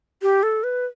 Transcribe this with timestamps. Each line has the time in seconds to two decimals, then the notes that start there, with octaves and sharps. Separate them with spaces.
0.22 G4
0.43 A4
0.63 B4